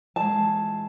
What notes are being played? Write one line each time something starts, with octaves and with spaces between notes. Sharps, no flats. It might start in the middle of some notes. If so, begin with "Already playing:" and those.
A#2 E3 G#3 A5